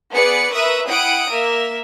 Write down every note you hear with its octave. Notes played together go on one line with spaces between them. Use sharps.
B3 G#4 B4 D5 C#7
A#4 B4 E5 C#6 D#6
E4 F#5 G5 D#6 D7
A#3 A#4 E5